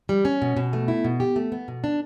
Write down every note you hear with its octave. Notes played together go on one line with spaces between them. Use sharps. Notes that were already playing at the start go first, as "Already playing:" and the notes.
G3
C#4
B2
B2
A3
E4
B2
G4
A3
B3
B2
D4